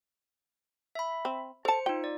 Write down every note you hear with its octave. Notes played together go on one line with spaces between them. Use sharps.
E5 B5
C4
A4 C5 A5 C#7
D#4 F4 G5
D5